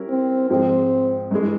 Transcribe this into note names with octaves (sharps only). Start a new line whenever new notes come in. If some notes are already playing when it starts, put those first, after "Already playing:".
Already playing: G3 C#4 E4 A#4
C4
G#2 F3 G#3 C4
G2 E3 G#3